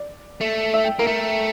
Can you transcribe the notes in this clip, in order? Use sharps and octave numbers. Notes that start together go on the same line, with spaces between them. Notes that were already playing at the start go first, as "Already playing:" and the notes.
Already playing: D5
A3
E5
G5
A#3 A#4
A3 A4